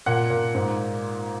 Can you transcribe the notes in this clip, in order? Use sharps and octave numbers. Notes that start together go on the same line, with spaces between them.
A#2 F#5
A#2
G#2